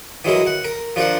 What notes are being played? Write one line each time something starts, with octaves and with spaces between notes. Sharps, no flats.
E3 F#3 G#3 E4 A#4
F#5
A#4
F3 D4 A#4 C5 F#5